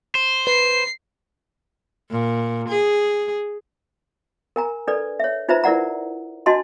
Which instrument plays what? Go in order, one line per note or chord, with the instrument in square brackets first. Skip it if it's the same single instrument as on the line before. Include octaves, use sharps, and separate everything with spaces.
[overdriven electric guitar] C5
[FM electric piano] B4 [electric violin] C7
[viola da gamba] A#2
G#4
[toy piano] A#4 G#5 A#5
D4 A4 B4 D5
C#5 E5
D#4 F4 B4 C5 E5 A#5
E4 A#4 D5 F#5 A#5
D4 F#4 D#5 A5 C6